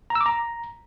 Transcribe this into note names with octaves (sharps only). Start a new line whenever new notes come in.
A#5
E6
D6
A#5